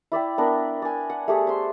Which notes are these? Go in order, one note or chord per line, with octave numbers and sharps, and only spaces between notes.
E4 D5 E5 G5
B3 D4 A#4
D5 G#5
F#5
A3 G4 G#4
C5 C6